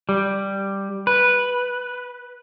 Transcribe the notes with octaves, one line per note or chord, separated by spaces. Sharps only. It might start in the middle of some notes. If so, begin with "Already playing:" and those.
G3
B4